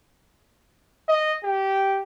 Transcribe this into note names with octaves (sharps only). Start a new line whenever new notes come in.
D#5
G4